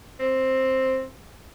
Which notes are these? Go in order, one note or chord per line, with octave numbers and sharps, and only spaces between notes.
C4